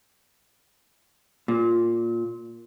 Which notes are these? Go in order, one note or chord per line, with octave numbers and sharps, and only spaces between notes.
A#2